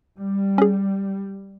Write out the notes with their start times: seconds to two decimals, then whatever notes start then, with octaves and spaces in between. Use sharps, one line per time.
0.18 G3
0.58 C#4 G#4